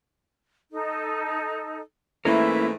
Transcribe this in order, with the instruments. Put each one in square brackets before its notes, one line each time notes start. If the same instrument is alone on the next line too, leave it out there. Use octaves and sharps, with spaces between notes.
[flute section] D#4 A4
[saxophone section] G#2 E3 A3 [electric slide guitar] A#3 C#4 A#4 [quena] E4 [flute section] E5